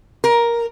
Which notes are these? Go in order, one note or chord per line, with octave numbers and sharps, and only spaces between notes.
A#4